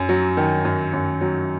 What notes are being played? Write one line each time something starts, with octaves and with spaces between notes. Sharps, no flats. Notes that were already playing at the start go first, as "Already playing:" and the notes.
Already playing: F#2
F#3
D#3
F#2
F#2
F#3